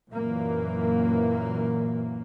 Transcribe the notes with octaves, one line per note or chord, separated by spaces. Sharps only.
F#2 A#2 E3 A#3